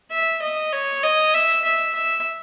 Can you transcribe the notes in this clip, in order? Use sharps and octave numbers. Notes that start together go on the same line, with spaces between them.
E5
D#5
C#5
D#5
E5
E5
E5